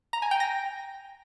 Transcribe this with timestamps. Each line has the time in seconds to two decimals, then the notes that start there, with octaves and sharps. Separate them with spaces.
0.13 A#5
0.22 G#5
0.31 G5
0.40 A#6